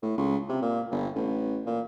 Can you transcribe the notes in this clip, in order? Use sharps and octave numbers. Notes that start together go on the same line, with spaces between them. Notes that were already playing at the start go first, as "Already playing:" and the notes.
A2
C#2
C3
A#2
G1
A1
A#2